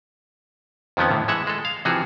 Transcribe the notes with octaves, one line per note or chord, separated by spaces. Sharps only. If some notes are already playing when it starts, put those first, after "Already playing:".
F2 D#3 F3 F#3 B3 C#4
A2 D3
E3 G#3 E5 F#5
G#3 A4
F5
C3 E3 F3 F#4 G#4